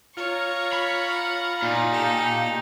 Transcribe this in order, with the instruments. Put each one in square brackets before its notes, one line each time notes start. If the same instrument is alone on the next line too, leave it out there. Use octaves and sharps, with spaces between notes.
[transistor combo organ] F4 [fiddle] C#5 [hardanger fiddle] A#5 C#6
[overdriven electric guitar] B5
[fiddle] F#5
[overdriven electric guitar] A#2 [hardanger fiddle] D#4
[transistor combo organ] G4 [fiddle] A4 F6